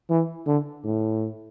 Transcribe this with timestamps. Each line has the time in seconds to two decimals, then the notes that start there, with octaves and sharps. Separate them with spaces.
0.10 E3
0.46 D3
0.84 A2